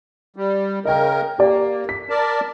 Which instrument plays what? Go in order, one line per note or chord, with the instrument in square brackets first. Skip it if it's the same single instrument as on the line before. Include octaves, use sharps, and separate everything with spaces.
[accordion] G3
[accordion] C#3 A#4 [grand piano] D#5 G5
[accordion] A#3 [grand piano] G4 D5
[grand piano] B6
[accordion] A#4 D5 A5